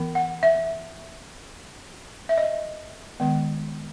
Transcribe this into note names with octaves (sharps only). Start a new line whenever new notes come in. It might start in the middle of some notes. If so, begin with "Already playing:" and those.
Already playing: E3 B3
F#5
E5
E5
D#5
D#3 G#3 B3